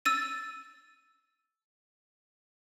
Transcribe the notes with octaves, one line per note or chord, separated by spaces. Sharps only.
E6 A6 D#7